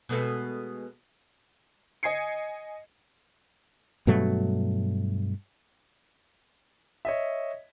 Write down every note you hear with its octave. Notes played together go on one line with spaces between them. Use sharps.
B2 G#3 A3
D#5 G#5 G#6 C7 C#7
G2 B2 F#3 A3
C#5 D#5 E5